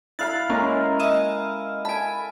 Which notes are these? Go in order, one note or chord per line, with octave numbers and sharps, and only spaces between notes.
E4 F5 B5 F#6 A6
G#3 A#3 C#4 A#4
D#5 E5 D#7
G#5 A5 B5 D7